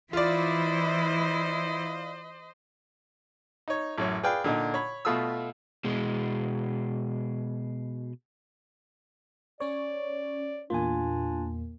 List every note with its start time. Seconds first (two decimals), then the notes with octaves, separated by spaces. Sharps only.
0.13 E3 E4 F4 C5 D5 D#5
3.68 D#4 C#5
3.98 A1 F#2 C#5
4.23 G#4 B4 D5 F5 G5
4.44 A#2 D3 D#4
4.74 C#5 B5
5.05 B2 A3 F4 D#6 E6
5.85 B2 G#3
9.60 C#4 C#5 D5
10.70 E2 A#2 A#3 D4 F4 G#5